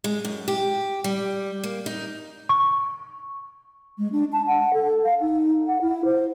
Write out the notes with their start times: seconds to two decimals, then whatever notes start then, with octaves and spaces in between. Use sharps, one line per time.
0.04 G#3
0.25 F#2
0.48 G4
1.04 G3
1.63 A#3
1.86 D#4
2.49 C#6
3.99 G#3
4.12 D4
4.33 A5
4.47 F#5
4.74 A4
5.04 F5
5.21 D#4
5.68 F#5
5.81 E4
6.05 C5